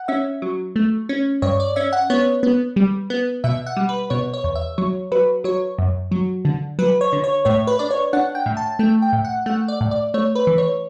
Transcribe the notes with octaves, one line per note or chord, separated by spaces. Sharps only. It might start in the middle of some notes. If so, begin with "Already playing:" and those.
Already playing: F#5
C#4 E5
F#3
A3
C#4
G2 C#5
D5
C#4 E5
F#5
B3 C#5
B3
G3
B3
B2 E5
F#5
G3
B4
B2 C#5
C#5
E2
E5
F#3 C#5
F#3 B4
F#3 C#5
F#2
F#3
D3
F#3 B4
C#5
D3
C#5
A2 C#5
B4
D4 D5
C#5
D4 F#5
G5
A2
A5
A3 G5
G5
A2
F#5
A3 F#5
D5
A2
D5
A3 C#5
B4
E3
C#5